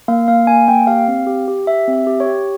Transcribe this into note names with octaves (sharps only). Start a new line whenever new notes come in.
A#3 F5
A#3 F5
A#3 G#5
A#3 G5
G4 F5
C4
G4
G4
G4 E5
C4
E5
G4
C#5
G4